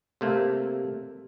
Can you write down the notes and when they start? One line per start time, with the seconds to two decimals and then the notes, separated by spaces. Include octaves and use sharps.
0.21 C3 A3 A#3